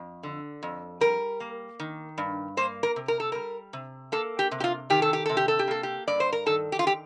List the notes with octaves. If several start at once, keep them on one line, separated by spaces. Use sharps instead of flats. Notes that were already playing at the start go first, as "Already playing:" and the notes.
Already playing: F2
D3
F2
G3 A#4
A#3
D#3
G2
A#3 C5
A#4
C3
A#4
A4
G3 A#4
C3
A#3 A4
G4
C3
G4
F4
D#3 G4
A4
G4
C3 A4
G4
A4
G4
A#3 A4
G4
G2 D5
C5
A#4
D#3 A4
G4
F4
G4